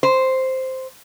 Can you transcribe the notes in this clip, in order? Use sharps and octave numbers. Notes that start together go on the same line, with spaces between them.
C5